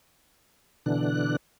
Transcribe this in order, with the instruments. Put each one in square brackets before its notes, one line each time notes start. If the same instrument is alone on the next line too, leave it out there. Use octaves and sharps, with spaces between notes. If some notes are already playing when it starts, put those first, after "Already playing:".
[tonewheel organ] B2 D3 E3 D4 F#6